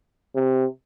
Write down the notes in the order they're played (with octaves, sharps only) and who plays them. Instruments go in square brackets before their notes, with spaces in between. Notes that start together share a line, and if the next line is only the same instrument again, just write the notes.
[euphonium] C3